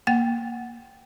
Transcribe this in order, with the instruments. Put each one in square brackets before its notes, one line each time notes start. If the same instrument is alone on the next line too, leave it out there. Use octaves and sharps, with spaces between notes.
[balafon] A#3 F#5 G5